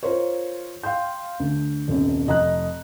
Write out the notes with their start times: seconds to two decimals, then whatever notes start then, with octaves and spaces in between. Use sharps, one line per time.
0.03 F4 A#4 C5 C#5
0.84 F5 G5 C6 G6
1.40 D2
1.88 D#1 B1 F#2 C3
2.27 F1 D#5 A#5 F#6